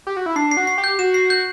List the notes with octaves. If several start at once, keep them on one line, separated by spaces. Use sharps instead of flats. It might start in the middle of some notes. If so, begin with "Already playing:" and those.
G4
F#4
E4
D4 C7
C7
F#4
C7
G4
G6
F#4 E7
C7
G6